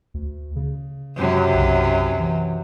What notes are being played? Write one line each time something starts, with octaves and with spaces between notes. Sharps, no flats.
D2
C#3
F#2 C3 F#3
B1
E3